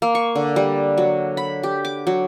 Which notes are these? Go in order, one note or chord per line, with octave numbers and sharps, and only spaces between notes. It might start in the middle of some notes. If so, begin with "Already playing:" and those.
A#3
C#6
D3
G3
F#3
B5
G4
D6
F#3